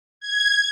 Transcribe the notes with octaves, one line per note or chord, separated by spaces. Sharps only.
G#6